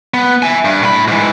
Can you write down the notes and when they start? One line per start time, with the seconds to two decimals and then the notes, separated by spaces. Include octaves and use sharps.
0.14 B3
0.42 E5 G#5
0.65 G2
0.83 A2 B5
1.08 G#2 E3